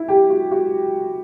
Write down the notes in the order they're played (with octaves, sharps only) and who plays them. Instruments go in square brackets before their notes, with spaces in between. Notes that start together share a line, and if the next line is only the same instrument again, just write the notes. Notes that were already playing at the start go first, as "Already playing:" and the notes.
Already playing: [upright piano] E4
G4
F#4
F#4